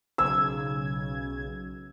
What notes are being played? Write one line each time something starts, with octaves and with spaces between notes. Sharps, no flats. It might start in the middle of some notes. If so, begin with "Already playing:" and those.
B1 C#3 E6 G#6